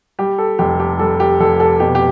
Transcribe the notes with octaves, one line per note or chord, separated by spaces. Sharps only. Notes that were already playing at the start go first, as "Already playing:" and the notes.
G3 G4
A4
F1 G4
G4
G3 A4
G4
F1 A4
A4
B2 G4
G4